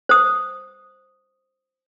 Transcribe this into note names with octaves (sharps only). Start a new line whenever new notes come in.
C5 D#6